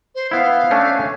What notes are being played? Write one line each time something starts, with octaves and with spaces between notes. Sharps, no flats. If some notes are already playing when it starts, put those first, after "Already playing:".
C5
B3 E4 F5
A3 C#4 D4